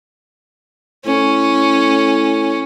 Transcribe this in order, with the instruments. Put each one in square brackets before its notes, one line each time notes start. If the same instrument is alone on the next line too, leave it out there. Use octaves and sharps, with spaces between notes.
[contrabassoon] A2 [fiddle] C#4